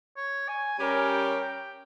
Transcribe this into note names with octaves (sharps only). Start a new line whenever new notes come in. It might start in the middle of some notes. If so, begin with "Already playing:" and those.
C#5
G#5
G3 C#4 G4 A#4 G#5
G5
G5